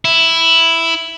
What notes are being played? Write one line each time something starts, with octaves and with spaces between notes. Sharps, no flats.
E4